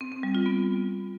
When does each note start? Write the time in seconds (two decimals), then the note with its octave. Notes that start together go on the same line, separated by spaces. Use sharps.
0.01 C4
0.12 C4
0.23 G3
0.35 F4
0.46 B3